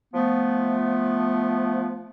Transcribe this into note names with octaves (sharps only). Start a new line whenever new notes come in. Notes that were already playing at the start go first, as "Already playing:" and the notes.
F3 A3 B3